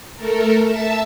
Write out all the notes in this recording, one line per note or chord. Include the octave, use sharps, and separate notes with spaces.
A3 A4 A#4
E5 A5 E6